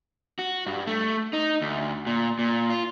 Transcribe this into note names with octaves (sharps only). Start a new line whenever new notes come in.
F#4
G2
A3
D#4
D2
A#2
A#2
F4